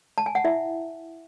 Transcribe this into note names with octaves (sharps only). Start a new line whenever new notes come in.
A5
G#5
F#5
E4 E5